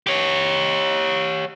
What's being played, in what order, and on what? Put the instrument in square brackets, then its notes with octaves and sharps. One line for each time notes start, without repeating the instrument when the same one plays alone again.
[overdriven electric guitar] G4 C#5